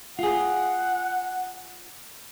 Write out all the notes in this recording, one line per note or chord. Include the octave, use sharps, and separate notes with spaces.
F4 G#4 F#5